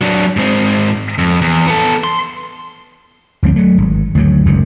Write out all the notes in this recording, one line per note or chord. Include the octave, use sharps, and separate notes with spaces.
F#3 D4
G#2 C4
F2
E2
B3 A4
C6
D2 G2 F3 C4
F#3 A3
G#1
D2 G2 F#3
F#1 C#2 F#2 D#3